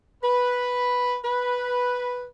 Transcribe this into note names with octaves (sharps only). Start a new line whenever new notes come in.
B4
B4